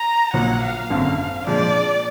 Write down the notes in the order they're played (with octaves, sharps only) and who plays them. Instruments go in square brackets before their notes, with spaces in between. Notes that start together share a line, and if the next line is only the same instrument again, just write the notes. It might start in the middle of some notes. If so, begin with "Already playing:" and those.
Already playing: [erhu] A#5
[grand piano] A#1 A#2 F#3 A#3 [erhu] F#5
[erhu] F5
[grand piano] G#1 F#2 D3
[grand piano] A#2 F3 G#3 D4 [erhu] D5